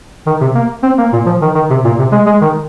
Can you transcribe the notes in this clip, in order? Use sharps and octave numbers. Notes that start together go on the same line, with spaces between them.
D#3
C3
A#3
C4
A#3
A#2
F3
D#3
D#3
C3
A#2
C3
G#3
G#3
D#3